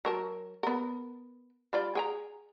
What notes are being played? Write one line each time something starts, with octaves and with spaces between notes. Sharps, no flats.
F#3 A#4 A5
B3 A#4
G3 F4 D5
G#4 G5 A#5